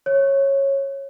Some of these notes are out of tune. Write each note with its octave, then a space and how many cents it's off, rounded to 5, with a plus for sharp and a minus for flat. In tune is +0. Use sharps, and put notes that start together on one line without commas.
C#5 -15